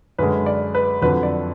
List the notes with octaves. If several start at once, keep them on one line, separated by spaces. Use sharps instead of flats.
F#2 D3 G#3 B4
D5
B4
F2 D3 F#3 B4
D5